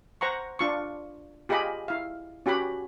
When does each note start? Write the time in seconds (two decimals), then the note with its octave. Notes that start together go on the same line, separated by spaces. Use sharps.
0.21 C5 F#5 A#5 C#6
0.59 D4 F4 C#6
1.49 F4 G4 G#4 D#5 B5
1.88 E4 F5
2.46 C#4 F#4 G4 F#5 B5